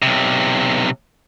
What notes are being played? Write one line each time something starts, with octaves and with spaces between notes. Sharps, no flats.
B1 C3